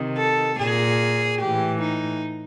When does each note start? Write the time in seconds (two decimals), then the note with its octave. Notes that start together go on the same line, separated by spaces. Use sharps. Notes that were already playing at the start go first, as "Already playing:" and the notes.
Already playing: C3 D#3
0.16 A4
0.58 A#2 G#4
1.40 A2 E3 G4
1.81 D#4